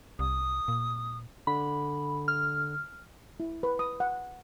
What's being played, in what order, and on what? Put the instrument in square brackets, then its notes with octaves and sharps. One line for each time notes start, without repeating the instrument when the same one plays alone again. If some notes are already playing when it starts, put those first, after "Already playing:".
[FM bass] C2 [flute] D#6
[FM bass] A#2
[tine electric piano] D3 [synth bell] B5
[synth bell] F6
[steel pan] E4
B4
D#6
F#5